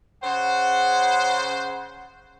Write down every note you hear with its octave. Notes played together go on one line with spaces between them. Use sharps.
C#3 C5 F#5